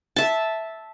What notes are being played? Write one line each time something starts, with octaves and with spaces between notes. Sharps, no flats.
E5 A5